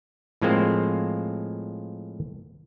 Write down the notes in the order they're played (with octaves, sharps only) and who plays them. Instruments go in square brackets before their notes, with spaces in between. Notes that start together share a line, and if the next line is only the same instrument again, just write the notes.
[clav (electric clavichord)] A2 F3 G#3 A#3 C4 C5